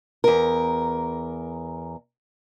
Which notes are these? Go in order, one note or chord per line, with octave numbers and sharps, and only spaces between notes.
E2 A#4